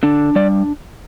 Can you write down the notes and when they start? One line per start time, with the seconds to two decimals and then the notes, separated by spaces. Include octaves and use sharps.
0.03 D3 D4
0.35 G3 D5